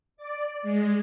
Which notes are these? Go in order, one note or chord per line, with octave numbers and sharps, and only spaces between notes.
D5
G#3